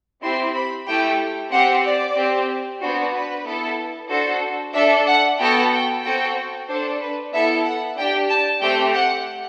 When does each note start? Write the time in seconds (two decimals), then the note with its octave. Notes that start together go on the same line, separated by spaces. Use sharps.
0.22 C4 E4 G4 C6
0.55 B5
0.87 A3 E4 G4 G5
1.52 C4 G4 F#5
1.84 D5
2.16 C4 G4
2.81 B3 D4 F#4 C5
3.13 B4
3.46 B3 E4 A4
4.09 D4 F#4 A4 C5
4.74 D4 A4 E5
5.07 F#5
5.39 B3 F#4 A4 G5
5.72 G5
6.03 C4 F#4 A4 G5
6.68 D4 A4 C5
7.00 B4
7.33 B3 E4 A4 E5
7.65 F#5
7.97 D4 G4 G5
8.29 A5
8.61 A3 C4 G4 G5
8.94 F#5